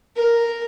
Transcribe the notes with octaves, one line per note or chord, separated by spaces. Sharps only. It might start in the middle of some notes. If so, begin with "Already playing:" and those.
A#4